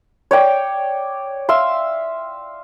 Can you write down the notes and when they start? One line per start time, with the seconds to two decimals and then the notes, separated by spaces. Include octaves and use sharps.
0.31 C#5 D5 G5 D6
1.49 E5 F5 C6